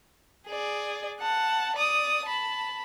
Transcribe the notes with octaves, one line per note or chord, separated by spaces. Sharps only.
G#4 D5
F#5 A5
D5 D#6
A5 B5